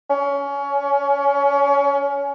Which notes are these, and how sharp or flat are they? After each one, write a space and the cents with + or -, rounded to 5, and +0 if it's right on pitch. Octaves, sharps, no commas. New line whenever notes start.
C#4 +25